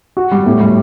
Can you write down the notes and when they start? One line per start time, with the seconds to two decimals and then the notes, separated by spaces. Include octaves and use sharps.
0.17 F#4
0.32 G3
0.46 A2
0.61 G3